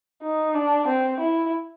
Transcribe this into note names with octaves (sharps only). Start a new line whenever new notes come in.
D#4
D4
C4
E4